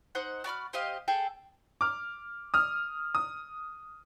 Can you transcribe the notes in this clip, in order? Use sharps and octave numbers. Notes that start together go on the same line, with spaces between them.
D#4 C5 F#5
F#4 D5 B5 F6
C4 G4 D#5 F5
G#4 A4 G5
D6 F6
D#6 F6
D#6